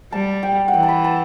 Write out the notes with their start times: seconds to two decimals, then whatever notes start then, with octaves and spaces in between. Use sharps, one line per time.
0.12 G3 A5
0.43 G5
0.68 F#5
0.73 E3 G5
0.83 A5
0.89 B5
1.04 A5